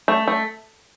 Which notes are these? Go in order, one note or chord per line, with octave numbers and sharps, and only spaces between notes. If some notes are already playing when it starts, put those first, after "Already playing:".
A3
A3